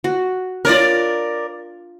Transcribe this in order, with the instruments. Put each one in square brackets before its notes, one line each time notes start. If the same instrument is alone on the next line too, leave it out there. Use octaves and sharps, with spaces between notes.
[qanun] F#4
[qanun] D4 F4 [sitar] A#4 C#5 D5